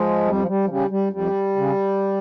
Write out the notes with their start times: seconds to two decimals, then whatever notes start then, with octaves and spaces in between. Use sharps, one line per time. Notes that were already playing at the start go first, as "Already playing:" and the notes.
Already playing: F3 G#3
0.26 F2 G3
0.40 F3
0.48 G3
0.65 F3
0.69 C#3 G3
0.90 G3
1.13 F2 G3
1.56 C#3